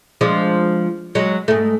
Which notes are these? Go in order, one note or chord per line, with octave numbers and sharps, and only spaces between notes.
F3 G#3 D4
F#3 G#3
G#2 A3